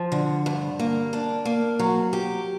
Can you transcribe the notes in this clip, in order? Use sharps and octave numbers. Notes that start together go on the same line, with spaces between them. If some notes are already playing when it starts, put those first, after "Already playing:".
Already playing: F3
D3
G2
A#3
D4
A#3
F#3
G4